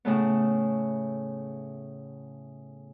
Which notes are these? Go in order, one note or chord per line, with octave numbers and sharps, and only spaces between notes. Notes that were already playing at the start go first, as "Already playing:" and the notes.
A2 C#3 A3 B3